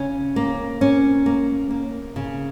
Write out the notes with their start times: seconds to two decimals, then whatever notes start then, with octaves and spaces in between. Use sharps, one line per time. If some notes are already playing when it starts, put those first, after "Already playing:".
Already playing: C#3 C#4
0.36 A#3
0.81 C#4
1.26 A#3
1.71 A#3
2.16 C#3